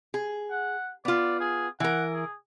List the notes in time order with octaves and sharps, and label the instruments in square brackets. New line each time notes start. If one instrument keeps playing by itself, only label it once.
[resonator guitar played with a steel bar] G#4
[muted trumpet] F#5
[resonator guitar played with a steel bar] B3 F4 [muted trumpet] D5
[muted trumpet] G#4
[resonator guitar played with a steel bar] E3 A#4 [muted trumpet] F#5
[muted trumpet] G#4